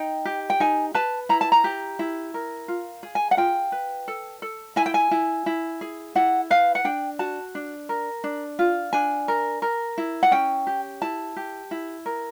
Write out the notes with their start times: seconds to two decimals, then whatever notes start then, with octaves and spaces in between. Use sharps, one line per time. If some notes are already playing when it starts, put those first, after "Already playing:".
Already playing: D#4 G5
0.25 G4
0.50 G5
0.60 D#4 G#5
0.94 B4 A5
1.29 E4 A#5
1.41 A5
1.52 A#5
1.64 G4
1.99 E4
2.34 A#4
2.68 F4
3.03 G#4
3.15 G#5
3.31 F#5
3.37 F4 G5
3.72 B4
4.08 A4
4.42 A4
4.76 E4 G#5
4.86 G5
4.94 G#5
5.11 E4
5.46 E4
5.81 G#4
6.15 E4 F#5
6.50 B4 F5
6.75 F#5
6.85 D4 G5
7.19 F#4 A5
7.55 D4
7.89 A#4
8.24 D4
8.59 F4
8.93 D4 G#5
9.28 A#4
9.62 A#4
9.98 E4
10.23 F#5
10.31 C#4 G5
10.67 G4
11.02 E4 A5
11.36 G4
11.71 E4
12.06 A#4